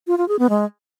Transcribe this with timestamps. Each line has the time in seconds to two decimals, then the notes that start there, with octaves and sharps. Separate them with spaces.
0.07 F4
0.18 F4
0.28 G#4
0.39 B3
0.50 G#3